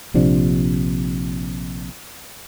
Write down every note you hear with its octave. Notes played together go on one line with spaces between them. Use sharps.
A#1 C3 F3 D4